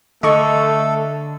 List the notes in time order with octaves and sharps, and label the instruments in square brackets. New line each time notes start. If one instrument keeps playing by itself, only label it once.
[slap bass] D3 [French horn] A3 [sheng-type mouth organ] A4 [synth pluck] D#5 C#6